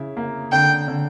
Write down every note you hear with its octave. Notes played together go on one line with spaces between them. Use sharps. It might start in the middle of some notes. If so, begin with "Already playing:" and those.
Already playing: C#3 E4
A#3
D3 G5
D3